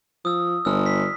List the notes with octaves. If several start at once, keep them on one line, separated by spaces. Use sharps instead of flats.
F3 D#6 E6
G1 E6 F6
B6